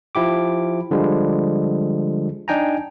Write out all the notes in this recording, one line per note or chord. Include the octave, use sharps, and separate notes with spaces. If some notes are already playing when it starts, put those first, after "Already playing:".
F3 E4 G4 D6
D3 F3 G3 G#3
D4 D#4 G5 G#5 A#5